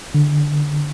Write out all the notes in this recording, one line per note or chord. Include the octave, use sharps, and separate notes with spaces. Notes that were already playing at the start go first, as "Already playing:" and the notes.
D3